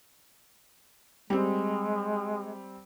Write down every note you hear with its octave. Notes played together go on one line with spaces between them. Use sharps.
G3 G#3 C4